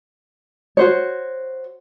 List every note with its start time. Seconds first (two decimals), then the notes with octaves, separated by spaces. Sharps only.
0.77 F#4 C5 C#5